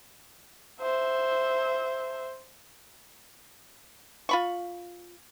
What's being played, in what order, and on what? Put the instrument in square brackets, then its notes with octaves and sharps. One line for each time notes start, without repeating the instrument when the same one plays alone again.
[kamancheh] C5 E5
[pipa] F4 B5 C#6